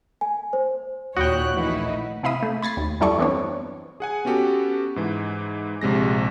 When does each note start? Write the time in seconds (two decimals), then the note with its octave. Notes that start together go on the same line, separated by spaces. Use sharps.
0.21 G#5
0.53 C5
1.17 D#2 A#2 F#4 C#5 G5 B5 D#6 F#6
1.56 A#1 E3 A3 D#4 E4 F#5
2.23 C3 E4 F5 B5 D#6
2.43 A3
2.62 B5 G#6 A6 C7
2.77 D#2
3.00 F#2 G3 E4 A4 D5 C#6
3.18 E3 B3 C4 D4 C#5
4.00 G#4 F#5 G#5
4.25 B3 C#4 F#4 G4 A4
4.96 G#2 E3
5.81 A#1 C3 G#3 A#6